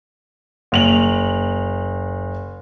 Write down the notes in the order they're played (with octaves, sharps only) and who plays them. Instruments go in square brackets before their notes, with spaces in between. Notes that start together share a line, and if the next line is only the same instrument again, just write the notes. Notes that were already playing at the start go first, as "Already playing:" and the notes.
[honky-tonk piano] F#1 F7 F#7